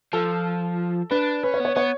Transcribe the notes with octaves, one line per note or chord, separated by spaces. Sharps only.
F3 A4
D4 B4
C#4 B4
C#5
B3
C#5
B3 C#5